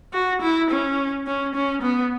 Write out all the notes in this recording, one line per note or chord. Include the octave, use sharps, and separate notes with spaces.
F#4
E4
C#4
C#4
C#4
B3